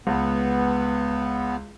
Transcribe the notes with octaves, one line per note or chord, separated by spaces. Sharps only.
C#2 B3